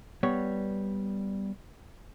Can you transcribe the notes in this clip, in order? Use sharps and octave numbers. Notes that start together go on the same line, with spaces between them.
G3 B3 C#5